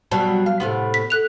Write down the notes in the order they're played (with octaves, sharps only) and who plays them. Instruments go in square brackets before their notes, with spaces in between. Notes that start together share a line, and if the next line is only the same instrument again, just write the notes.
[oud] B2 F#3 G3 [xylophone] A5
[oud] F5
A2 C3 B3
[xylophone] B6
A4 F#6 F7